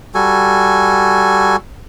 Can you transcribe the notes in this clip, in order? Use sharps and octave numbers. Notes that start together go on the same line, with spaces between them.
G3 F#4 A4 G#5